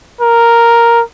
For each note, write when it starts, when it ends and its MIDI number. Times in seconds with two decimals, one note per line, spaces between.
0.21 1.02 70